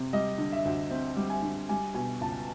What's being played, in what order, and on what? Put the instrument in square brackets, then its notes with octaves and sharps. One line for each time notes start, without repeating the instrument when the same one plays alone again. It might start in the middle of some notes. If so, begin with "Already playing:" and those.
Already playing: [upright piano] C3
G3 D#5
D3
E5
D2
C4
G3
G#5
D3
G3 G#5
B2 G#5
C#2 A5